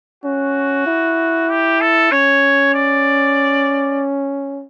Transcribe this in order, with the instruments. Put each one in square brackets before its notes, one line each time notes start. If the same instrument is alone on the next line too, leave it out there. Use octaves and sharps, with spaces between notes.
[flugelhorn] C#4 [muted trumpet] F#4
[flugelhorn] E4
[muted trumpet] G4
A4
[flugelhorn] C#4 [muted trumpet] C#5
[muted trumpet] D5